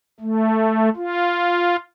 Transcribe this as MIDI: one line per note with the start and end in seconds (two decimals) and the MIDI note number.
0.20 0.89 57
0.96 1.76 65